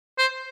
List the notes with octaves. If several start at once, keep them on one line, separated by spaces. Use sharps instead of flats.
C5